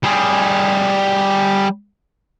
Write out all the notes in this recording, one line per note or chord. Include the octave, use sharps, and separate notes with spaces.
G3 G#4